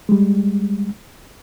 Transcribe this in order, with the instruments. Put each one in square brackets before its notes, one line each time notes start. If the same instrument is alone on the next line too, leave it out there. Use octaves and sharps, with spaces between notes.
[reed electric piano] G3 G#3